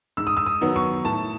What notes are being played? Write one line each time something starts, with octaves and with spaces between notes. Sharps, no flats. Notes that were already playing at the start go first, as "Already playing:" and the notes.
G#2 E6
D#6
E6
D#6
D#3 F#3 B3
C#6
A2 A5